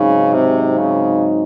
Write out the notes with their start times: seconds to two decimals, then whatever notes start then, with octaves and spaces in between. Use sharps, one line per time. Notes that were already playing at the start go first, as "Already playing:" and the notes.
Already playing: G#2 C#3 F#3 C4 D#4
0.33 C3
0.78 C#3